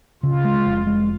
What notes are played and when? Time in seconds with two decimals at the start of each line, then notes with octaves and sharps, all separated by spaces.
0.23 C#3 F4
0.44 G#3
0.65 F1
0.87 G#3